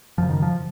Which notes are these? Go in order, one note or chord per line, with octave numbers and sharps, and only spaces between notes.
F#2 C#3 F3
D#3
F3